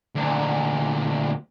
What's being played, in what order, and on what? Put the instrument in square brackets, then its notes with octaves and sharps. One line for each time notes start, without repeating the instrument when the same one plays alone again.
[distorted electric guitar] D2 A#2